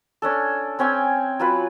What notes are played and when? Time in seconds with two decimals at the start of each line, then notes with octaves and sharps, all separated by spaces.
0.22 C#4 D4 A4
0.79 C4 C#4 G5 G#5
1.40 F#3 F4 B4